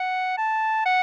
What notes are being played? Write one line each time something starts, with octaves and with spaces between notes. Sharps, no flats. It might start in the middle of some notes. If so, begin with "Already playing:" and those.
Already playing: F#5
A5
F#5